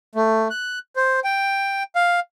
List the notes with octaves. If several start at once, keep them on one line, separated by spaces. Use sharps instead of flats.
A3
F#6
C5
G5
F5